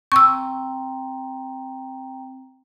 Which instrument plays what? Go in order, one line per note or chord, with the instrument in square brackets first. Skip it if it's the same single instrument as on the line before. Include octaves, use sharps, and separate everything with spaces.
[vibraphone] C4 G5 A#5 [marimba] C#6 E6